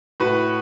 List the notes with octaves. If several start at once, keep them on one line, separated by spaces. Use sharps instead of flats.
A2 F#4 B4